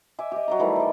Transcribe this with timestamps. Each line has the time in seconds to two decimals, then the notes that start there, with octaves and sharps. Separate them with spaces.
0.19 E5 G#5 D6
0.32 G4 D#5
0.48 F#3 D5 A#5
0.59 D#3 E3 G3 A3
0.76 C5 D5